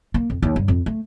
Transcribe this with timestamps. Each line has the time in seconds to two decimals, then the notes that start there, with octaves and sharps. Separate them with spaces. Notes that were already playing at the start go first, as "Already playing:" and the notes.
0.14 A#3
0.30 F2
0.42 D#2
0.56 G2
0.68 F2
0.86 A3